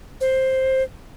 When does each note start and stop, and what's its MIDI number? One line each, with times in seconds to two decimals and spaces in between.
0.21 0.83 72